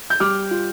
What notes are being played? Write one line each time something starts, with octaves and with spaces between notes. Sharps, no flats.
G6
G3 D6 F6
F4